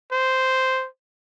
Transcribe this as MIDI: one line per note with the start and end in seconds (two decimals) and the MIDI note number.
0.12 0.87 72